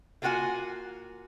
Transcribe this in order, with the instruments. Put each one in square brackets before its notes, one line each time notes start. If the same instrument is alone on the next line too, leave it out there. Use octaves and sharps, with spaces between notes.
[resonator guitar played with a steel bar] A3 A#3 F4 F#4 F#5 G#5